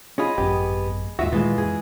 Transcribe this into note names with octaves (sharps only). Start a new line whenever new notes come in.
C#4 F4 G#4 D#5 B5
G#1 F#2 A2 B3 G4
D#2 G#2 F4 F#4 E5
A#2 D#3 E3 G#3 B3 F4
F2 G#4